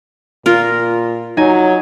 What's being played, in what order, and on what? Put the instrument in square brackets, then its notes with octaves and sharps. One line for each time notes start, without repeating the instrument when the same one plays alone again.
[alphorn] A#2 [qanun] F4 A#4
[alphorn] F#3 [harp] D#4 G#5